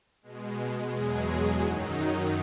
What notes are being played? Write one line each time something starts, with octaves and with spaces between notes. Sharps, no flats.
B2 G#3
E2 B2 F#3 G#3 G#4
F#2 D#3 F#3 D#4